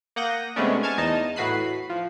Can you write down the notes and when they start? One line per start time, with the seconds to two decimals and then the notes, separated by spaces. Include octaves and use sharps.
0.16 A#3 F#5 D#6 G6 A#6
0.56 C3 G#3 A3 B3 C#4 D4
0.83 G#5 A5 C#6 F6 G#6
0.97 E2 D#4 D#5 A5
1.36 A2 F#4 B4 B5 F#6 C7
1.90 F3